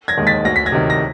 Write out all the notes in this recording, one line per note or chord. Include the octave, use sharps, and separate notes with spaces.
G#6 A#6
D#2 D#3 G#3
A6 B6
D2 A#6
B6
G#6 A#6
C3 D#3
A#6